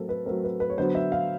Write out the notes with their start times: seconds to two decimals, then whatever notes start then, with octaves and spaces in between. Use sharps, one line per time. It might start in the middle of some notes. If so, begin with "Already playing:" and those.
Already playing: F#3 A3 C4 A4 A#4
0.09 B4
0.26 F#3 A3 C4 A#4
0.44 B4
0.60 B4
0.70 C#5
0.78 D3 F#3 B3 C5
0.95 E5
1.12 F5